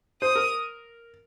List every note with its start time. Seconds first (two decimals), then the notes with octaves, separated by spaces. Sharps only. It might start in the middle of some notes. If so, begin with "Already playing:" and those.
0.22 C5 D#6
0.35 A#4